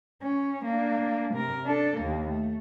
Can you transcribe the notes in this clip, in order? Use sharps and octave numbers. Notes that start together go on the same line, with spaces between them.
C#4
A#3 D4
C3 A#4
D4 A4
D#2 A#3
A3